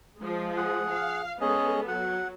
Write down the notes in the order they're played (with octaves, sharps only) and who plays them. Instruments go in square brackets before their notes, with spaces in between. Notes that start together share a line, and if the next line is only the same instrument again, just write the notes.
[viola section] F3 G#3
[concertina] G#4 F#5
[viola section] F5
[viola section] G#3 B3 A4 [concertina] C#4 G#4 D#5
[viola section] F#3 [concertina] F#5